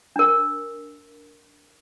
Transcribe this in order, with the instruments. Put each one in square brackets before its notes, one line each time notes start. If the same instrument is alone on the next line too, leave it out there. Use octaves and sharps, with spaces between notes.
[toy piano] D4 A#4